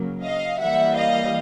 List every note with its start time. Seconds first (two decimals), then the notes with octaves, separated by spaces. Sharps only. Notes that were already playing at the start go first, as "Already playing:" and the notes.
Already playing: C#3 F#3 A#3
0.23 D#5 F5
0.59 E3 G3 A#3 E5 F#5
0.96 D#5 F5